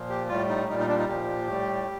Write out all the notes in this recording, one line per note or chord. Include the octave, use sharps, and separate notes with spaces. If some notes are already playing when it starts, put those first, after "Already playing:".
Already playing: A#2 F3
G4
A2 G3 F4
D#4
A#2 G3 D#4
D#4
D4
D#4
A#2 F3 G4
A2 G3